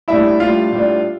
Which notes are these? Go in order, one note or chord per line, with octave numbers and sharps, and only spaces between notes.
A2 G3 D4 E4 E5
A2 G3 D4 F4 F5
A2 G3 D4